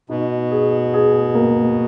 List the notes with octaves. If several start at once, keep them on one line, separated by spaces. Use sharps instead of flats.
B2 D#4
G#4
G#4
A#3